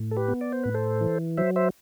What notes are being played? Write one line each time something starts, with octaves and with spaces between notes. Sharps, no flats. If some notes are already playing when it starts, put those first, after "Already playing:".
Already playing: A2
A4
G4 B4
B3
D5
C5
A2 B4
A4 C5
E3
F#3 C5 E5
C5 E5